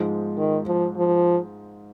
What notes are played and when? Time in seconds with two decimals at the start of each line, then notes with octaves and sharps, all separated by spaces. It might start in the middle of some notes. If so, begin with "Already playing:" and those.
Already playing: G#2 F3 G#3
0.37 D#3
0.67 F3
0.97 F3